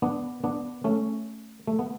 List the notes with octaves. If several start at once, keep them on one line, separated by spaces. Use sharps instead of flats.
B3 D4
B3 D4
A3 C#4
A3
B3